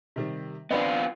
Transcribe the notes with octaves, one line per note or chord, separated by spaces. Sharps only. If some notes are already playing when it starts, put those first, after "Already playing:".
C3 D#3 G3
B3 C4 D4 F4 B4 D5